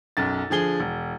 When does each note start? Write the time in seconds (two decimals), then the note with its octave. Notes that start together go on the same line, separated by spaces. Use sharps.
0.17 B1 F#2 A6
0.50 D3 F3 G#4 G7
0.80 E1